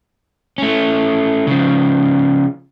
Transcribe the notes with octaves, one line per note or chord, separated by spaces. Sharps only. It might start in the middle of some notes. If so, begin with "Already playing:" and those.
A3 C#4
C#3 F3